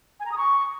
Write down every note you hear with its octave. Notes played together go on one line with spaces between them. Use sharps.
G#5
A#5
D#6
C#6